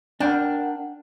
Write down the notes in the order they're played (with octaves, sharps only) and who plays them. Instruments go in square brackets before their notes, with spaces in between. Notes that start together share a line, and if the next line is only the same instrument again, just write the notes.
[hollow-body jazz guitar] D4 [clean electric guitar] A#4 F#5 G5